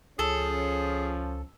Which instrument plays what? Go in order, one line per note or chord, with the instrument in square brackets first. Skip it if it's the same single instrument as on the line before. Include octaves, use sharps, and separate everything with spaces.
[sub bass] C#2 [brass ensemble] F3 C#4 [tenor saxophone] G#4 [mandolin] A4